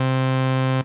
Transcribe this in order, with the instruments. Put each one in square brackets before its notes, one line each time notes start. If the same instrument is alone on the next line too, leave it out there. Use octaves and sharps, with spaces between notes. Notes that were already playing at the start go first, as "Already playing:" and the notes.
Already playing: [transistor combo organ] C3